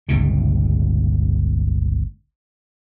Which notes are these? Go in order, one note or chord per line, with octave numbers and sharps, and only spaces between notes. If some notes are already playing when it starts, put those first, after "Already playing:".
G1 C#2 A#2 D#3